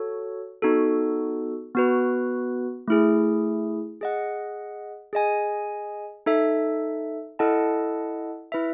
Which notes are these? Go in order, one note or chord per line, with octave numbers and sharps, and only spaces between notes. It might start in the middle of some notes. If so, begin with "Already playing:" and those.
Already playing: F#4 A4 C#5
B3 D#4 F#4 A4
B3 F#4 B4
A3 E4 G#4
G#4 D#5 F#5
G#4 D#5 G#5
D#4 A4 E5
E4 A4 D#5 F#5 A5
E4 B4 E5